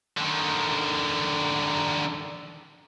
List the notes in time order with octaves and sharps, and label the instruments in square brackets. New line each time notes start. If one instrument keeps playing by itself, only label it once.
[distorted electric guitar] D3 D#3